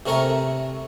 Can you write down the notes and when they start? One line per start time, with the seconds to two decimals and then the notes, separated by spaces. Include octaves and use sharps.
0.06 C3 A3 A#4 C#5 G#5 A#5